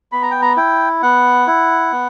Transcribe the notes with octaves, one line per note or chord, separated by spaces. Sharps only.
B3 B5
A#5
G5
A#5
E4 G5
B3 F#5
E4
B3